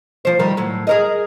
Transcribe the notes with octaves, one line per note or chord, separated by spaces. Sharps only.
F3 C5
D#3 G3 A#4
A2 F#3
G#4 A#4 D#5